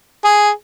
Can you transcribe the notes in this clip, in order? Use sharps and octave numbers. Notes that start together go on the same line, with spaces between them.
G#4